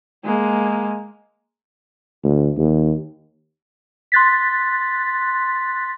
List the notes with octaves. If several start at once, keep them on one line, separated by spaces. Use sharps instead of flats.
G#3 A#3
D2
D#2
C6 F#6 A6 B6